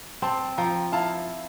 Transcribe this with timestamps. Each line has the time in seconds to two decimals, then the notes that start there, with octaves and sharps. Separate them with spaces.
0.22 C4 A5 C6
0.57 F3 G5 A#5
0.92 E4 F5 A5